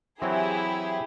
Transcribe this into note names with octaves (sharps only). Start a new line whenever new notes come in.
E3 F#3 C4 E4 G4 G#4